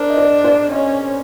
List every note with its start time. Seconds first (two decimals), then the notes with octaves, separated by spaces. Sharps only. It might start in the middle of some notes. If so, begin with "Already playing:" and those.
Already playing: D4 A#4 C5
0.10 D#5
0.17 C5 D5
0.44 C5 D5
0.71 C#4 C#5 D#5